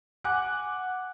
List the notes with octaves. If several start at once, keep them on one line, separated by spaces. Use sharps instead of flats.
F#5 G#5 D6 F#6